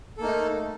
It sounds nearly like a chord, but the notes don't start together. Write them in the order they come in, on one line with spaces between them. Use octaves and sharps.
A4 A#3 D#4 A3